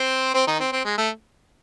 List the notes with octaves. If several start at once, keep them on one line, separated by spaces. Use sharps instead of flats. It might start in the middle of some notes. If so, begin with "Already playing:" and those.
Already playing: C4 C5
C4 C5
D#3 D#4
C4
C4
G#3
A3